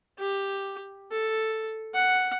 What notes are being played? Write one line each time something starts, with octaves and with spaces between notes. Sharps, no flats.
G4
A4
F#5